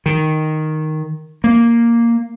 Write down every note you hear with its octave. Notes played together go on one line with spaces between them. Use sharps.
D#3
A#3